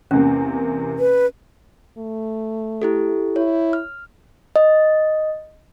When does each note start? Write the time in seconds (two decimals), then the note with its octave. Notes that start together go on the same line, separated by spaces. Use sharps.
0.11 E2 C3 A#3 C#4
0.99 B4
1.98 A3
2.82 E4 G4 A4
3.36 E4 C#5
3.73 F6
4.56 D#5